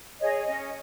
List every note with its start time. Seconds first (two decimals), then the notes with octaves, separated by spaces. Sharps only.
0.20 G#4 C#5 D#5
0.47 C#4 D#5